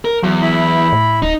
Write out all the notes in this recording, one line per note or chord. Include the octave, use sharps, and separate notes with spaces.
A#4
E2 F#3
E4 B5
A2
D1 D#4